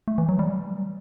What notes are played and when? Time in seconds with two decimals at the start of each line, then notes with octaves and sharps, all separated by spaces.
0.08 A3
0.18 E3
0.29 F#3
0.39 G3